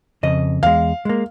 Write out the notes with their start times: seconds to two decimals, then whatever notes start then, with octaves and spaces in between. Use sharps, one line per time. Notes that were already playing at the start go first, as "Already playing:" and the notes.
0.23 F2 C#3 D#5
0.63 E2 G#3 F5
1.05 G#3 A#3